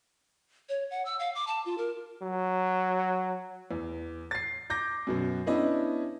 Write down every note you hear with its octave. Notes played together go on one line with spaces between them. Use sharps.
C#5
F#5
E6
F5
D6
A5
F4
A#4
F#3
E2
A6 C7
D6 G6 A#6
F#2 B2 F#3
B3 C#4 D4 E4 D#5 E5